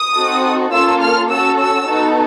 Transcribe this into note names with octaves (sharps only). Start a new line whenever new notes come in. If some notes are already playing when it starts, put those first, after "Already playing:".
Already playing: D#6
C4 D#4 F#4 A4
A#3 C#4 F4 A4 E6
F6
C#4 F#4 A4 E6
E6
B3 D#4 F#4 A4